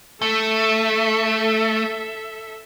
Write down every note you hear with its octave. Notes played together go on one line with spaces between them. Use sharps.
A3 A4 E5